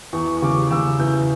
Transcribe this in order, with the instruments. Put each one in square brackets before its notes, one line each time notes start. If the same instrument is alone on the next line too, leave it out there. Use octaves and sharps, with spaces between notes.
[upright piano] E2 C#6
C#6
C#3 D6
D6
C#3 E6
E2 G6